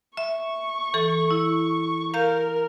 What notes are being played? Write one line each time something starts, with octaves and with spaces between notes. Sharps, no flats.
E5 C#6
E3 A4
E4
A#4 F5 A#5 G6